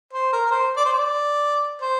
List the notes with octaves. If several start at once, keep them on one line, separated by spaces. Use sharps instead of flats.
C5
A#4
A#4
C5
D5
C5
D5
C5